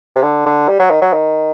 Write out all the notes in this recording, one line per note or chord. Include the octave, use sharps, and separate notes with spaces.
C3
D3
D3
G3
F#3
D#3
F#3
D#3